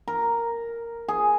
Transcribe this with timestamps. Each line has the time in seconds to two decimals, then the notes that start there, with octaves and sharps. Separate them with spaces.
0.08 A#4
1.08 G#4